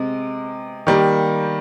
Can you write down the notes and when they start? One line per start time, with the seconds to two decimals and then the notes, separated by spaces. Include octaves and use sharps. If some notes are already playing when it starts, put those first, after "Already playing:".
Already playing: C3 G#3
0.87 D#3 G3 A#3